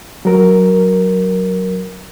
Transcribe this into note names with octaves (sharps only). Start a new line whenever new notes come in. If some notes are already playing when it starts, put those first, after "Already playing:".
F#3 A#4